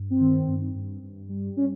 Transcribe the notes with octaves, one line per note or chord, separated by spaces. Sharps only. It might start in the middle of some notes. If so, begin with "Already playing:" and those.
Already playing: G2
C4
D#3
G2
G2
G2
G3
C#4